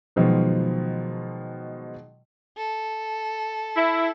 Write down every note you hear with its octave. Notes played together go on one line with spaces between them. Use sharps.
B2 D#3 F3 F#3 G#3
A4
E4